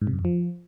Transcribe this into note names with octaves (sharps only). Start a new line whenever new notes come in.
G#2
C3
F#2
F2
F3